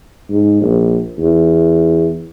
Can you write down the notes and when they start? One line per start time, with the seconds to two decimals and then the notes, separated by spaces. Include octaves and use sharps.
0.30 G#2
0.62 A#1
1.18 E2